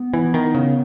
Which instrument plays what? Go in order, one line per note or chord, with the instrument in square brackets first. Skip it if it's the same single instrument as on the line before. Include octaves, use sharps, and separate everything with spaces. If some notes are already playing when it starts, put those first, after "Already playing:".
Already playing: [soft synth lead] B3
[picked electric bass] E3
D#3
C#3